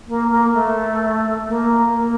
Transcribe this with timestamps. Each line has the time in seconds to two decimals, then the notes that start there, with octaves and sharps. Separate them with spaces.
0.07 A#3
0.31 A#3
0.54 A3
1.48 A#3
1.94 A#3